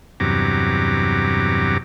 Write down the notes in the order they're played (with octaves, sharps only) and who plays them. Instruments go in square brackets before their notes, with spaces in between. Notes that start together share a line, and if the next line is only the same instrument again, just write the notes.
[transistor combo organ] E2 G2 C3 F#3 A#5 D6